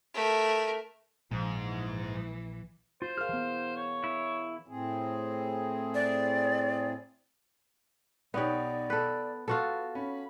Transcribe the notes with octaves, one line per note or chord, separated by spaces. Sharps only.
A3 A#4
A#1 G#2 F3
E3
F4 C5
G#4 A#4 F5 F6
E3 B3
C#5
E4
A2 C4 G#4
D5
B1 B3 D#4 G4 C#5 D5
A4 B4
B3 F4 F#4 A4
C#4 B5